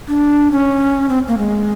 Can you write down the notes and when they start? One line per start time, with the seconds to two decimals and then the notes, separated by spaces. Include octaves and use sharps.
0.08 D4
0.51 C#4
1.09 C4
1.28 A#3
1.38 G#3